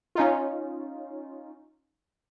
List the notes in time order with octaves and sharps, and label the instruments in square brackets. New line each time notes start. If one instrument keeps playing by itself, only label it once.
[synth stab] C#4 D#4 F4